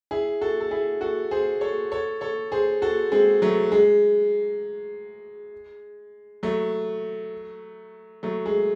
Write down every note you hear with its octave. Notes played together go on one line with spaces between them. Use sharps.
E4 G#4
F#4 A4
A4
E4 G#4
F#4 A4
G#4 C5
A4 C#5
A4 C#5
A4 C#5
G#4 C5
F#4 A4
G#3 C4
F#3 A3
G#3
F#3 A3
F#3 A3
G#3